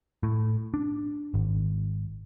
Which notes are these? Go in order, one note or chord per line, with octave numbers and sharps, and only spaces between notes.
A2
D4
G#1